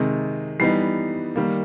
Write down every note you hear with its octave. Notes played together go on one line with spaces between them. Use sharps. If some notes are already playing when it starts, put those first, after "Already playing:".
Already playing: C3 D#3 G#3
E3 G3 B3 D#4 C7
D#3 G3 A#3